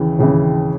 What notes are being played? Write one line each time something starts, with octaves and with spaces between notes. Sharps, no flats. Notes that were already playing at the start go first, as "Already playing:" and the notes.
Already playing: D#2 C#3 E3
D#2 C#3 E3